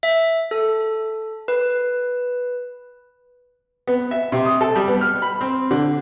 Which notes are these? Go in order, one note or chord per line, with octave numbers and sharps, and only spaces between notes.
E5
A4
B4
B3
E5
C3
D#6
A4
G3
B3
F6
B5
C4
D3